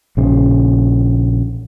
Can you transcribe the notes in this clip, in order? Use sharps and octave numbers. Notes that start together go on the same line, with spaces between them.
A#1 C#3